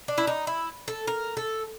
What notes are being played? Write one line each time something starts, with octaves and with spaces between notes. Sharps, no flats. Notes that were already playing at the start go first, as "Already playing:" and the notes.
D4
E4
D#4
E4
A4
A#4
A4